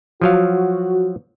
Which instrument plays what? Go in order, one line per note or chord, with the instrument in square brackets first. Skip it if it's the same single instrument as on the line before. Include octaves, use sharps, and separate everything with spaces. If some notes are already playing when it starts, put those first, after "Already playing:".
[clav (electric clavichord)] F3 F#3 F5 [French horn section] F#4